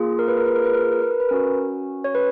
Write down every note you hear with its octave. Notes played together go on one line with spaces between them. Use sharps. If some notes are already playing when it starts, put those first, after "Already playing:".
Already playing: A#3 F4 G#4
A#4
B4
A#4
B4
A#4
B4
A#4
B4
A#4
B4
A#4
B4
C#4 F#4 A#4
C#5
B4